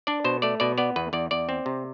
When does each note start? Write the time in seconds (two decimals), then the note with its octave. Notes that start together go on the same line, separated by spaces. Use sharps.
0.07 D4 D5
0.24 B2 C5
0.42 A3 D5
0.60 B2 D5
0.78 B3 D5
0.96 E2 B4
1.13 E2 D5
1.31 E2 D5
1.49 C4
1.66 C3